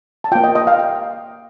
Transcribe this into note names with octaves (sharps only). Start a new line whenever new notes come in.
A5
A#3 F4 G5
D#5
D#5
F5
G5